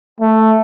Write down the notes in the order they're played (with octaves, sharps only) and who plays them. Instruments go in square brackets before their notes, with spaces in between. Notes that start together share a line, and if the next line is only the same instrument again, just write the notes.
[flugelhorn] A3